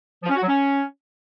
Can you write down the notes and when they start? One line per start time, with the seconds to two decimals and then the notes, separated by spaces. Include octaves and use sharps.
0.23 F3
0.29 C#4
0.36 F#4
0.42 F#3
0.48 C#4